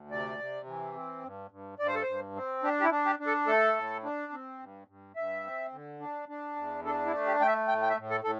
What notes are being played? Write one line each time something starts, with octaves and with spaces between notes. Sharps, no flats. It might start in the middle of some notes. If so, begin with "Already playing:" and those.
Already playing: D2
C3 D5
C3
E3
C4
G2
G2
G2 D5
C5
A4
G2 C5
C4
D4 G4
G4
E4
D4
G4
D4
A4
A3 A4
A2
D4
C4
G2
G2
G2 E5
C4
D3
D4
D4
E2
D4 A4
E4
A3
G4
A3 G5
E5
A2 G5
G5
E5
A2
A4
A2 A4